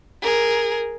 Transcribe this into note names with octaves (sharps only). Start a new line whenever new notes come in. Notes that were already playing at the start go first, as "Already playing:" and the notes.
G#4 A#4